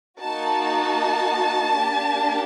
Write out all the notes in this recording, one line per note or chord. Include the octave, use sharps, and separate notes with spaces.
A#3 D#4 F#4 A5
A#3 D4 G4